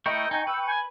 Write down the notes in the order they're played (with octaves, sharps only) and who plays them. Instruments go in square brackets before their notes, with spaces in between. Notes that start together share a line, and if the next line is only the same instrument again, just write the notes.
[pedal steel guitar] A3 E4 A#4 [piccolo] D#5 [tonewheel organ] G5 C#6
[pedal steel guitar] D#4 [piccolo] G#5
[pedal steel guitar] B4 [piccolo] E6
[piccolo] G#5